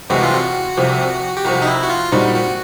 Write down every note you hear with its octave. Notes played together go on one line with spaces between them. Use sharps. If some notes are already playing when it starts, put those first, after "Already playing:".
C2 C3 E3 G#3 F#4
F4
F#4
C2 C3 F3
G4
C2 C3 F3 F#4
D#4
E4
F#4
F4
A#2 G3 C4 D#4 F#4
F#4